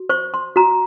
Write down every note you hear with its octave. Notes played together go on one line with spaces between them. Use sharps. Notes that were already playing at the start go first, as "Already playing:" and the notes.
Already playing: F#4
C5 C#6
C6
F#4 A#5